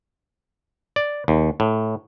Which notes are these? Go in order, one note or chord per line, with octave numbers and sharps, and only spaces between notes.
D5
D#2
A2